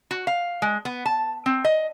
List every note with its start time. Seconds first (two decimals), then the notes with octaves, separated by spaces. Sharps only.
0.11 F#4
0.27 F5
0.62 G#3
0.85 B3
1.05 A5
1.46 C4
1.65 D#5